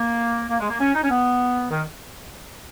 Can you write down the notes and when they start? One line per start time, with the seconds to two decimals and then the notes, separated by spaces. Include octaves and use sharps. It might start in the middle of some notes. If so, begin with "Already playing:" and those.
Already playing: A#3
0.50 A#3
0.60 G#3
0.70 A#3
0.80 C#4
0.94 D#4
1.03 C#4
1.11 B3
1.71 D#3